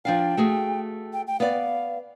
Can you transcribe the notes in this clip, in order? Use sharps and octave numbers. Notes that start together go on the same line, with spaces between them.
F3 D4 F5 G5
A3 F#4 G#4
G5
G5
B3 D5 F5